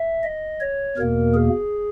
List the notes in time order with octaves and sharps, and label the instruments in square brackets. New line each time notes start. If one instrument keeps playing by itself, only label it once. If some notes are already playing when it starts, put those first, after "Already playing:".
Already playing: [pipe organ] E5
D#5
C#5
E2 B2 A#3 A#4
G#4